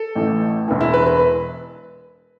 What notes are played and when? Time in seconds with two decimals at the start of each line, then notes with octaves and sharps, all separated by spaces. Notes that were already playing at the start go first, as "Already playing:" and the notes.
Already playing: A4
0.15 A1 A2 E3
0.68 E1 E2 E3
0.81 E4
0.94 B4
1.07 B4